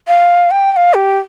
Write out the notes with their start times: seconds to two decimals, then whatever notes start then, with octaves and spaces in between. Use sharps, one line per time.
0.08 F5
0.51 G5
0.72 G5
0.76 F5
0.94 G4